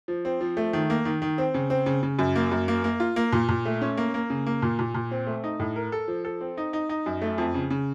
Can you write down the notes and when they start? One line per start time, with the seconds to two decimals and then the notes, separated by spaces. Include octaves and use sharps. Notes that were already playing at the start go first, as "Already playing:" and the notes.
0.08 F3
0.25 C4
0.41 F3
0.57 A3
0.73 D#3
0.90 A#3
1.05 D#3
1.22 D#3
1.38 C4
1.54 C#3
1.70 C4
1.86 C#3
2.03 C#3
2.19 F#2
2.36 A#3
2.51 F#2
2.68 A#3
2.84 A#3
3.00 F4
3.16 A#3
3.33 A#2
3.49 A#2
3.66 A3
3.81 C#4
3.97 A#3
4.14 A#3
4.30 C#3
4.46 A#3
4.62 A#2
4.79 A#2
4.94 A#2
5.11 C4
5.27 A3
5.44 D#4
5.60 A2
5.76 A#4
5.92 A4
6.08 F3
6.25 A4
6.41 C4
6.57 D#4
6.73 D#4
6.89 D#4
7.06 F#2
7.22 A3
7.38 F2
7.54 C#3
7.71 C#3